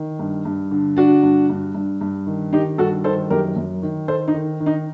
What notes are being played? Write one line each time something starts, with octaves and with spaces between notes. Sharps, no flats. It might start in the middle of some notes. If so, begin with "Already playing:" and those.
Already playing: D#3
G2
G2
D3
D3 D4 F#4
G2
G2
G2
G2
D#3
D#3 D#4 G4
G2 F#4 A4
D#3 A4 C5
F#2 G4 A#4
F#2
D#3
D#3 A4 C5
D#4
D#3
D#3
D#4